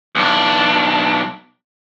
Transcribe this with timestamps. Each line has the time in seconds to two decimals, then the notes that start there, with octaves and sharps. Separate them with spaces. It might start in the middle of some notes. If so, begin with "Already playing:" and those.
0.15 B1 D4